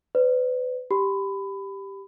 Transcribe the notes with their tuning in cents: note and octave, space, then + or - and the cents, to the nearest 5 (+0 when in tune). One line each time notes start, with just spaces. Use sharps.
B4 +35 D5 -30
G4 +0 B5 +20